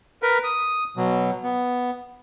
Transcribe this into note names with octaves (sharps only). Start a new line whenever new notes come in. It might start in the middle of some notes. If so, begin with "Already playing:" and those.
A#4 B4
D#6
B2 F#3
B3